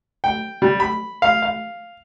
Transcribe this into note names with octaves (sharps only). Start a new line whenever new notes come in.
G5
G3
B5
F5
F5